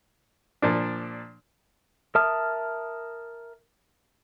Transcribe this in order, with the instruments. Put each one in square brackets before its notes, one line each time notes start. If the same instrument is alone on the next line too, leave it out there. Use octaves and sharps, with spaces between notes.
[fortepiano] A#2 F3 D4
[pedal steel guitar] A#4 E5 A5 D#6 F6